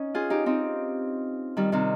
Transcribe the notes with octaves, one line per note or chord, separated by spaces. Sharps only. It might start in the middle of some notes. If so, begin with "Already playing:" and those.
Already playing: C#4 D#4
F4 G#4
D#4 G4
C4 D#4
D#3 G3
C3 D#3